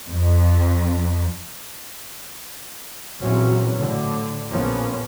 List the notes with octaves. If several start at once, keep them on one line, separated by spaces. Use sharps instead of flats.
F2
A#1 A#2 E3 F#3 C4 C#4
A2 D3
A#1 F3 A#3 B3 C#4